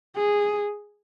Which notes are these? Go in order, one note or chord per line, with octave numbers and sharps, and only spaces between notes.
G#4